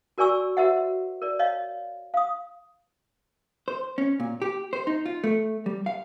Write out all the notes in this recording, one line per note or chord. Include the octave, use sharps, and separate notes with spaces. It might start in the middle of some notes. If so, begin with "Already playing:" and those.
F#4 A#4 D5 G#5 C#6 E6
F#4 A#4 C5 E5 F#5
A#4 D5
C#5 D#5 F5
F5 D#6
C5
C#4
A#2
G4
C5
D#4
F4
A3
G3
F5